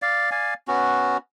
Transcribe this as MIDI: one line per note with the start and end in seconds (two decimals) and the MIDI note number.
0.02 0.30 74
0.02 0.30 77
0.31 0.54 74
0.31 0.54 77
0.31 0.54 80
0.68 1.17 59
0.68 1.17 61
0.68 1.17 66